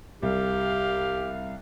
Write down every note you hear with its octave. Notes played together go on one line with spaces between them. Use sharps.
C2 G4 F5